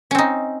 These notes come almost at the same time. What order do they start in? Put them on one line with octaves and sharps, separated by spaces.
C#4 C4 D#4